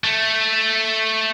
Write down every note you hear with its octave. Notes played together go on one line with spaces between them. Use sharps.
A3